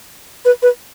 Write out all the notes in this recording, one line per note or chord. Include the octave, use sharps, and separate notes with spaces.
B4
B4